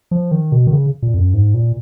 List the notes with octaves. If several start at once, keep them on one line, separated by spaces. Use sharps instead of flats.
F3
D#3
B2
D#3
C#3
A#2
F2
F#2
G#2
A#2